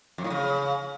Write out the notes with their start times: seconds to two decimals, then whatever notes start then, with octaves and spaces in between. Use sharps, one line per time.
0.18 F2
0.24 A2
0.30 C#3